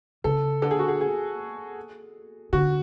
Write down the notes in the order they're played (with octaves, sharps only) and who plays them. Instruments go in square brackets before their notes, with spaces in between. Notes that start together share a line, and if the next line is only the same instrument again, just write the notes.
[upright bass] C#3 [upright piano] A4
[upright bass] D3 [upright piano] A4
[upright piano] G#4
F#4
G#4
G#4
[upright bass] D3 [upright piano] F#4